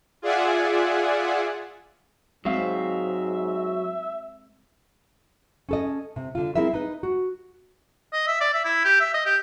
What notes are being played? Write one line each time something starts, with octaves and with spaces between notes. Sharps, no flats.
F4 G#4 D5 E5 F#5 G#5
G#2 F#3 G#3 C4 E5 F5
C#4 A4 D#5
C3
D3 F4
C4 E4 G#4 A#4 E5
D#4 B4
F#4
D#5
E5
D5
E5
E4
G4
E5
D#5
G4